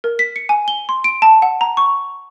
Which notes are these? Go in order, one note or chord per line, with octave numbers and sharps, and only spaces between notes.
A#4
B6
C#7
G#5
G7
C6
D7
A5
F#5
A#5
C#6